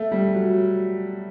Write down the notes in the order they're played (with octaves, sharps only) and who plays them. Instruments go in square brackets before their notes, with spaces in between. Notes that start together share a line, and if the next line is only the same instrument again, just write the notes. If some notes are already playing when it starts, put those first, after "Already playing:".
Already playing: [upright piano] A3
G3
F#3